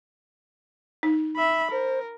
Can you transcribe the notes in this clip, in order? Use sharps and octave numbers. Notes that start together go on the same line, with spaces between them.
D#4
E5 B5
A#4 C5